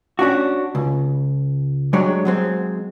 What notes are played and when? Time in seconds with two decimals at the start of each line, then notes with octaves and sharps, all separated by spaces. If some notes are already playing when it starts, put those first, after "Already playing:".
0.19 C#4 D4 F#4
0.75 C#2
1.93 F#3 G#3 D4 G4 C#5
2.25 F#3 G#3 C4